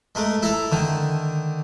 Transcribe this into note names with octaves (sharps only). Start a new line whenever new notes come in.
G#3 A3 A#4
E4 A4 A#5
D3 D#3